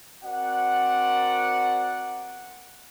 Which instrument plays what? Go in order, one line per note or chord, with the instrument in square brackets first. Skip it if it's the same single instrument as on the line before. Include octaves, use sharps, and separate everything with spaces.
[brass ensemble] C4 F#4 A#4 D5 F#5